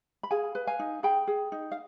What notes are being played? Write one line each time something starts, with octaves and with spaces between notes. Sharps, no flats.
B5
G#4 F5 G#5
B4
F5 G#5
D#4
G#4 G5 B5
G#4
D#4
F5